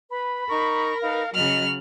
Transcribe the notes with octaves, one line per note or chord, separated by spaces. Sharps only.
B4 B5
D#4 A#4 A#5 C#6
D#4 B4 F5
C#3 F#3 D#5 F6 F#7